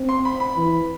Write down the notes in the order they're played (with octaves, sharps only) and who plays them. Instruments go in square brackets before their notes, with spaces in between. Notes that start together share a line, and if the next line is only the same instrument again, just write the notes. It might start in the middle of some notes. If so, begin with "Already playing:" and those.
Already playing: [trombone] C4
[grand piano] C6
B5
B5
[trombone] E3